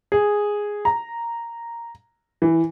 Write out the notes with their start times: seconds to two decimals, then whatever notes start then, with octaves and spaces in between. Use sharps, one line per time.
0.12 G#4
0.85 A#5
2.42 E3